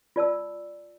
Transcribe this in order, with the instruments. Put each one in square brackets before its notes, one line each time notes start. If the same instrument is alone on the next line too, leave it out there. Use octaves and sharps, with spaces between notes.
[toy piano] F4 D5 A5 E6